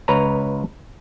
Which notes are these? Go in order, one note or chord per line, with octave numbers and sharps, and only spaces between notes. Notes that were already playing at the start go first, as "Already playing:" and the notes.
C#2 B4 C#5 A#5